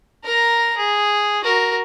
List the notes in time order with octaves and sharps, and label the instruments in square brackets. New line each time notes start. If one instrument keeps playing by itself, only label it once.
[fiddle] A#4 A#5
G#4
F#4 A#4